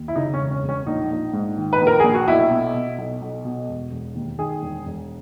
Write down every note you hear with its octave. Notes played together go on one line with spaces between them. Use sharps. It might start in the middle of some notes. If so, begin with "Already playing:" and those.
Already playing: D#2
E4
C#3 D#4
C#4
E1
C#4
E1
C#4
A#1 D#4
A#1
G#2
D#3
B4
A#1
A#4
A#1 G#4
F#4
B1 E4
B2
B2
B1
B1
B2
E1
E1
D#2
D#3 G#4
E1
E1